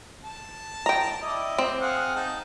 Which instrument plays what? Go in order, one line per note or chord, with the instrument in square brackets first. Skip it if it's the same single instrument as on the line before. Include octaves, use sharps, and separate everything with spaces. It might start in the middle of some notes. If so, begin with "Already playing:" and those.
[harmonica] A5
[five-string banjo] G5 A#5
[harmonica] E4 D5 D#5
[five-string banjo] C4
[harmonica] G#4 F5 F#5
D#4 A5